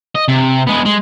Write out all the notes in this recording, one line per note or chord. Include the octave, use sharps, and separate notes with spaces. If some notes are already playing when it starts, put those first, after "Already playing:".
D#5
C3
G#3 B3
G#3